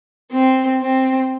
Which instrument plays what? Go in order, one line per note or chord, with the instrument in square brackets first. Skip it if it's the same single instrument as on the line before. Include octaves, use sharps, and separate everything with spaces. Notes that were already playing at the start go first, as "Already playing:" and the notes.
[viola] C4
C4